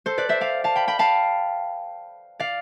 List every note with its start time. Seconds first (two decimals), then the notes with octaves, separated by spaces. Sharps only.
0.06 A4 C5
0.18 B4 D5
0.29 C5 E5
0.41 D5 F5
0.64 F5 A5
0.76 G5 B5
0.88 G5 B5
0.99 F5 A5
2.40 D5 F5